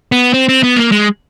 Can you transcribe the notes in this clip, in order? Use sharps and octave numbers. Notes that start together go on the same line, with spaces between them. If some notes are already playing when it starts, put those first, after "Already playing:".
B3
C4
C4
B3
A#3
G#3